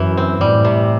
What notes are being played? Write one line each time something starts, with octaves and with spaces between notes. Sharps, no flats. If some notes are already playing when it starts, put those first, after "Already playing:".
Already playing: F#2 E3
C4
A2 G3
C3